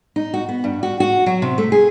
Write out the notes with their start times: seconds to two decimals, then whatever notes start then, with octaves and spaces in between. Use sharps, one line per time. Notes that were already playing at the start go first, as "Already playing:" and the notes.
0.16 D#4
0.34 F#4
0.49 B3
0.64 G2
0.83 F#4
1.00 F#4
1.26 F#3
1.42 C3
1.58 A3
1.72 G#4